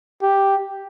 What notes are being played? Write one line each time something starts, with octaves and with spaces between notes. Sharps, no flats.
G4